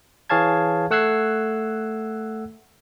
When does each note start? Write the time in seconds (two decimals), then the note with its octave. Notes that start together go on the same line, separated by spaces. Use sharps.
0.30 E3 G#4 C#5 F5 A5 G#6
0.91 A3 F#5 E6 F#6 G#6 C7